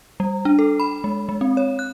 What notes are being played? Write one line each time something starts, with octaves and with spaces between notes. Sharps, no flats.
G3
D4
A4
B5
G#3
G#3
C4
C#5
F#6